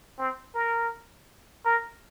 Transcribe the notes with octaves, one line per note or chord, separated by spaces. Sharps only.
C4
A#4
A#4